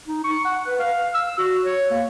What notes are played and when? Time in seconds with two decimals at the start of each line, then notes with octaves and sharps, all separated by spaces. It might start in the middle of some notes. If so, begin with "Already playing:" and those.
0.08 D#4
0.24 C#6
0.45 F#5
0.67 B4
0.79 F5
1.14 E6
1.38 F#4
1.64 C#5
1.91 A#3